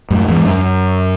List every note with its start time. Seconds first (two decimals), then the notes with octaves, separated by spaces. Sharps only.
0.10 F#2 A2
0.28 E2 G#2
0.45 F#2